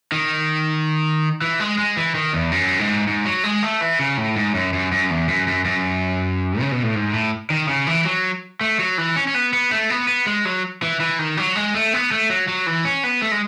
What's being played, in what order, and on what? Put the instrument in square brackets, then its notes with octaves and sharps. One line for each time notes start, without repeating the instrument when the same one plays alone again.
[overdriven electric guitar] D#3
E3
G#3
G#3
E3
D#3
E2
F#2
G#2
G#2
F#3
G#3
A3
E3
C#3
A2
G#2
F#2
F#2
F#2
E2
F#2
F#2
F#2
C#3
B2
A2
G#2
A2
D#3
C#3
E3
F#3
A3
F#3
E3
C#4
C#4
B3
B3
A3
B3
B3
G#3
F#3
E3
E3
D#3
F#3
G#3
A3
B3
A3
F#3
F#3
E3
C#4
B3
A3
G#3